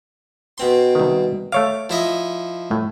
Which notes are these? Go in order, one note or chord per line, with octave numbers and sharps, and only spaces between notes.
B2 C4 C6
C2 D#3
A3 C#5 F5 D6
F3 E4 D#5
A2